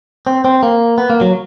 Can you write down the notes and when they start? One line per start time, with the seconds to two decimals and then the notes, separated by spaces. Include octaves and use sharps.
0.27 C4
0.45 C4
0.63 A#3
0.98 B3
1.10 A#3
1.21 F#3